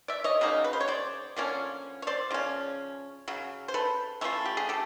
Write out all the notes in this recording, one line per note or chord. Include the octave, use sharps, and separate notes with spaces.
D5 E5
C#5 D#5
C#3 F#3 A#3 D#4
B4
C5
C#5
C5 D5
D3 F3 A#3 C#4
C#5
C5 D5
C#3 F3 C#4
C#3 F#3
C5
A4 B4
E3 A3 C#4 F4
G4
G#4
G4 A4